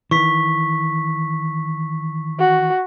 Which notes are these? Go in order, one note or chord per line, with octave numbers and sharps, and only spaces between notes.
D#3 E3 C#6 B6
F#4